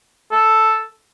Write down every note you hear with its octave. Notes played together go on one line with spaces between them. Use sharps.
A4